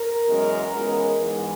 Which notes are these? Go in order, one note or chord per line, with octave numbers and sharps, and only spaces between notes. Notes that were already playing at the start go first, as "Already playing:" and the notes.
Already playing: A#4
F#2 E3 G#3 B3
C#2 C#3 E3 G#3 B3
G#2 E3 G#3 B3 G#4